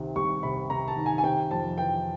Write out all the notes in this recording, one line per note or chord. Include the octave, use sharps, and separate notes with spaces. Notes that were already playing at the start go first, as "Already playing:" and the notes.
Already playing: C2 C3 D#3
C2 C#6
C3 B5
C3 A#5
A5
D#3
G#5
G#5
C3 G5
F2 A5
E3 G5